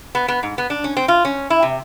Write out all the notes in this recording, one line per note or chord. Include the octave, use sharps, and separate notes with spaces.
B3
B3
G#2
B3
D4
C#4
C4
F4
C#4
E4
C3